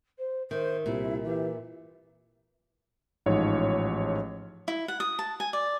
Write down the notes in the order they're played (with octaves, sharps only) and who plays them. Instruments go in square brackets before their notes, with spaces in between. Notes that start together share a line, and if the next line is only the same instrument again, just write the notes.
[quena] C5
[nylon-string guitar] D#3 [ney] C5 [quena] E5
[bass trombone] C2 [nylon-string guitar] A#2 [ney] E4
[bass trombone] E3 [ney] G4
[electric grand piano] A1 G#2 F3 C#5
[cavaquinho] E4
F#5
D#6
A5
G#5
D5